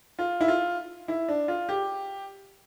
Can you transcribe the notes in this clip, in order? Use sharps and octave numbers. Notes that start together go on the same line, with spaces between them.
F4
E4
F4
E4
D4
F4
G4